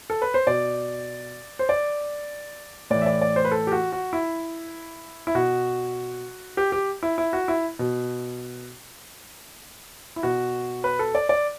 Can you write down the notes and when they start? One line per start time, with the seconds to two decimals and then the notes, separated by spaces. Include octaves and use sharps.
0.10 A4
0.22 B4
0.34 C5
0.47 B2 D5
1.59 C5
1.69 D5
2.90 A2 E3 D5
3.02 E5
3.06 D5
3.22 D5
3.36 C5
3.45 B4
3.51 A4
3.67 G4
3.72 F#4
3.92 F#4
4.13 E4
5.27 E4
5.35 B2 F#4
6.57 G4
6.72 G4
7.03 E4
7.18 E4
7.33 F#4
7.48 E4
7.79 B2
10.16 E4
10.23 B2 F#4
10.84 B4
10.99 A4
11.15 D5
11.29 D5